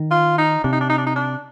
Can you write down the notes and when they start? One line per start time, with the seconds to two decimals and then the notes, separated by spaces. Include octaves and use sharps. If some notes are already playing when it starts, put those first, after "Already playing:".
Already playing: D#3
0.11 F4
0.38 D#4
0.64 C3 D4
0.72 D#4
0.81 D4
0.90 D#4
0.98 D4
1.07 D#4
1.16 D4